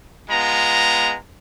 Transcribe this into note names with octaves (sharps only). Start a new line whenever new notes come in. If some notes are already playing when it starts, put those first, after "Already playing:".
G#3 B3 F4 A#5